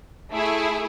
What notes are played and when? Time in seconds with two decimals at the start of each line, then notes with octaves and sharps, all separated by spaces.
0.32 A3 E4 G#4